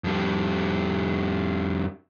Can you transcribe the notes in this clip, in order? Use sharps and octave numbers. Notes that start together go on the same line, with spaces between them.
F2 G3